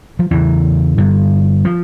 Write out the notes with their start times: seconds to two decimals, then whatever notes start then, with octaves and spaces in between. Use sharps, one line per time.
0.19 F3
0.31 E2 C#3 E3
0.98 G2 D3
1.65 F3